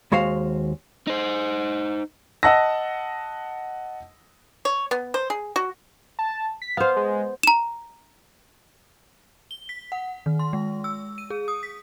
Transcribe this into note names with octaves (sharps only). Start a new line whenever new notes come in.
D#2 G#3 F#4 C5 F5
D#4 C5
D#5 F#5 A5 E6 A#6
C#5
B3
C5
G#4
F#4
A5
B6
B3 C5 F5
G#3
A#5 E7
G7
B6
F#5
D#3
C6
G#3
E6
D#7
G#4
D#6
B6